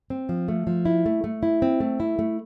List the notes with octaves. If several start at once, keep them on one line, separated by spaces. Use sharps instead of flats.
C4
F3
A3
F3
E4
A3
A3
E4
C4
A3
E4
A3